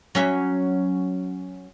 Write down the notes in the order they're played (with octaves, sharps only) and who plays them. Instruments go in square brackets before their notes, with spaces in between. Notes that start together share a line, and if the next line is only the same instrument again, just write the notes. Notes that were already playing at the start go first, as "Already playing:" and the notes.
[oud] F#3 C#4 E5